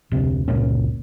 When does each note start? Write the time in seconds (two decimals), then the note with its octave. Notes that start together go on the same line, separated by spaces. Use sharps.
0.12 F1 D2 C3
0.48 G1 C#2 A#2 C#4